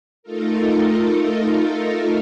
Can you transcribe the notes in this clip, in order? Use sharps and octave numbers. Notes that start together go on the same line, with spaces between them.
A3 D#4 F4 A4 A#4